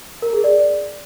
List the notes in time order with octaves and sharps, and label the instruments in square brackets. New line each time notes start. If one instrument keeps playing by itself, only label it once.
[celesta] A#4
G#4
D5